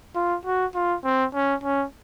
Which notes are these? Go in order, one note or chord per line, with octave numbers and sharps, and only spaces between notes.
F4
F#4
F4
C4
C#4
C#4